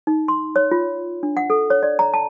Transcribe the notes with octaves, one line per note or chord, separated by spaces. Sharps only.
D#4
C6
C#5
F4
D4
F#5
A4
C#5
D5
A#5
A5